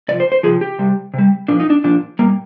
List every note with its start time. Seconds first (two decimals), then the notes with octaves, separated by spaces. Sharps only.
0.08 C3 F3 D5
0.20 C5
0.32 C5
0.43 C3 F3 G#4
0.61 G4
0.79 C3 G3
1.14 C3 G3
1.48 A#2 F3 D4
1.60 D#4
1.70 D4
1.84 A#2 F3 D4
2.19 G3 A#3
2.22 A#2